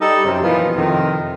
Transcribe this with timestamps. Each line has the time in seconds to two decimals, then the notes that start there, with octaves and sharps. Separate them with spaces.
0.01 G3 D#4 A4
0.25 F#2 C3
0.43 A#2 E3 F3 B3 D#4 F4
0.74 F2 C3 D#3